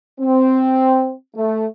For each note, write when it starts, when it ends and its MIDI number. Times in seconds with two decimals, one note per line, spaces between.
0.20 1.11 60
1.35 1.65 57